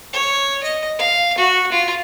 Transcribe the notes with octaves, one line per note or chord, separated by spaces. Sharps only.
C#5
D#5
F5
F#4
F4